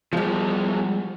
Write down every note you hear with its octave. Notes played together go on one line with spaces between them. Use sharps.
B2 F3 G3 G#3